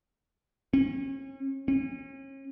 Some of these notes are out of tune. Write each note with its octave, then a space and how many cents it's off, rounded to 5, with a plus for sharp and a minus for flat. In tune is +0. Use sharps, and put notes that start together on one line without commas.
C#4 -35
C#4 -35